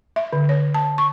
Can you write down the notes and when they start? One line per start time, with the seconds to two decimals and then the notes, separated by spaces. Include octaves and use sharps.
0.16 E5
0.33 D3
0.49 C#5
0.74 A5
0.98 C#6